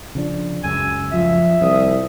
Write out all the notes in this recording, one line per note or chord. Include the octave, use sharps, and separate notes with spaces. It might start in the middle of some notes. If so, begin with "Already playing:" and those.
C#3 F3 D4
C#2 F#2 C#3 G#5 E6
F3 E5
C2 F3 D#6